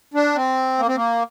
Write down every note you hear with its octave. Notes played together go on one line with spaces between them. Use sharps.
D4
C4
A#3
C4
A#3